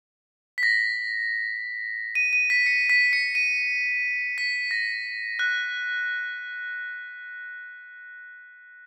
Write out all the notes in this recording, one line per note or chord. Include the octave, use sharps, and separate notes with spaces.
B6
A#6
D#7
D#7
B6
C#7
B6
C#7
D#7
B6
A#6
F#6